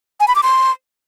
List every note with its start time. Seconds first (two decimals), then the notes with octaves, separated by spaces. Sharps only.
0.20 G#5
0.28 B5
0.35 D6
0.43 C6